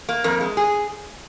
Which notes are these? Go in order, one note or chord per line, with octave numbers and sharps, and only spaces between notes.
A#3
F2 A#4
G#3
G#4